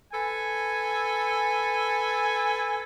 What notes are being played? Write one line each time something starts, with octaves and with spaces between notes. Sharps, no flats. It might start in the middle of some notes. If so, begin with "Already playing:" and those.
A4 B4 G#5